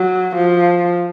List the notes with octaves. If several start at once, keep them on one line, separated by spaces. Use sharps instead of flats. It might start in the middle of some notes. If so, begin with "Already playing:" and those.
Already playing: F#3
F3